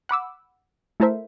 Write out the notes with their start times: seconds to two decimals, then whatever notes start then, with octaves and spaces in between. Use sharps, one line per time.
0.09 F#5 B5 D6 E6
1.00 A3 E4 A4 A#4 C5 E5